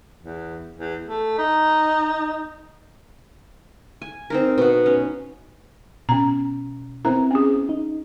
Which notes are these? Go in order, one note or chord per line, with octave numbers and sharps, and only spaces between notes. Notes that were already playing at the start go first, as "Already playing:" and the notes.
E2
E2
A3
D#4
G#5
C4 D#4 A#4
B2 F#5
C#4
B2 C#4 A#5
B3 C4 E4 A#4 A#5
C#4 G#4
D#4